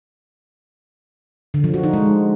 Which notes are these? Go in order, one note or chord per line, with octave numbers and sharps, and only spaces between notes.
D3
F3
F#4
D#4
G#3